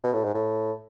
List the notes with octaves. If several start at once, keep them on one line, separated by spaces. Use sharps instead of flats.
B2
A2
G#2
A2